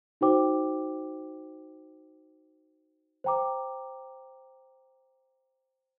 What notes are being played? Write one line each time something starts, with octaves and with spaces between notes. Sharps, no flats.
D#4 F#4 C5 G5 D6
C5 G5 A#5 D6